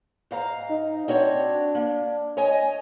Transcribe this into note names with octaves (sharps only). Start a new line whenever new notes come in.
G#2 F5 A#5
D#4
C4 D4 F#4 C#5
A#3
C#5 D#5 G#5